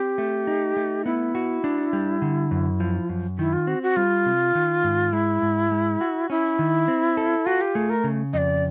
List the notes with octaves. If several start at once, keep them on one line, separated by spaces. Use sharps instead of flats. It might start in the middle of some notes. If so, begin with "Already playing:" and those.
Already playing: C4 G4
A3
D#4
A3
B3 E4
F#4
D4
G3
D3
F#2
F3
F#2
D#3 E4
F4
C4 F#4
F#4
G3 F4
C3
D#3
G#2
G#3 E4
G#2
G#3
F#4
C#4 E4
D#3
C4
A4
F4 F#4
G4
A3 G#4
A#4
C#3
F2 D5 D#5